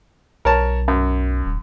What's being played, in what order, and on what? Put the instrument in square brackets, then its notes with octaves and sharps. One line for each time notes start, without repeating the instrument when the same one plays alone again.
[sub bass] B1 [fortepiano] A#4 C#5 A5
[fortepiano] F#2
[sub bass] D#1